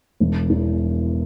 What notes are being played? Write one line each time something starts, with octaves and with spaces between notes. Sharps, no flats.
E1
E2